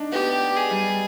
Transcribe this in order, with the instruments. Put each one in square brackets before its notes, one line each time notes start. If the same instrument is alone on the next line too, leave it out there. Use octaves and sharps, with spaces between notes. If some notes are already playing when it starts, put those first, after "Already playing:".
Already playing: [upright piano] D4 D#4
[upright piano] B3 [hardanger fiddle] G4
[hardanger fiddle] G#4
[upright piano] G3